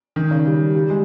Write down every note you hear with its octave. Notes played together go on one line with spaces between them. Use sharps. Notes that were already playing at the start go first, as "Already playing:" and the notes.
D#3
C#3
G3
G3
G#3